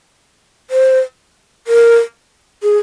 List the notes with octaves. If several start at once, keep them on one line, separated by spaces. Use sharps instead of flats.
C5
A#4
G#4